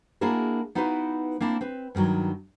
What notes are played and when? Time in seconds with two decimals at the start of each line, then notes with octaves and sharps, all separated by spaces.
0.21 A#3 D4 E4 F#4 G#4 A#4
0.75 B3 D#4 E4 F#4 B4 F5
1.40 A#3 C4 D4 E4
1.61 C4 B4
1.95 G2 D3 D#3 F#3